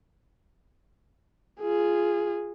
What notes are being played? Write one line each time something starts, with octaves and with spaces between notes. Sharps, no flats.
F4 G#4